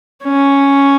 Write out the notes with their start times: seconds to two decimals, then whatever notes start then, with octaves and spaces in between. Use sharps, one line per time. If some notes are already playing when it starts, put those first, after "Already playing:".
0.24 C#4